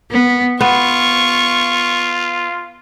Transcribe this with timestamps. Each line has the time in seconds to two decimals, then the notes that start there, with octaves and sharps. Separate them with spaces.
0.11 B3
0.61 B3 F4 C#6